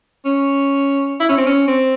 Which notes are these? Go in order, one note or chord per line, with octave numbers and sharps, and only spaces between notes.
C#4
E4
C#4
C4
C#4
C4